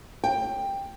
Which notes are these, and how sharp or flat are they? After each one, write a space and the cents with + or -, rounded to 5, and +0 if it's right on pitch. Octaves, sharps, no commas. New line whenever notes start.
G5 +10